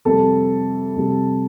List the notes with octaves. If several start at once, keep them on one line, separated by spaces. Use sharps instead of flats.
F2 C3 G3 A4
F2 C3 G3